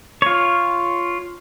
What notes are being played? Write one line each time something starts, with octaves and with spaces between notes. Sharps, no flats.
F4 C#5